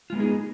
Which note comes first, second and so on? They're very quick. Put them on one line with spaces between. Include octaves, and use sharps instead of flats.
F4 G#3 B3 D#4 G#4